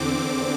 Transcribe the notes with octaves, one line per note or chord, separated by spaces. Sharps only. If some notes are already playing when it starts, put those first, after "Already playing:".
Already playing: E2 D3 C4 D6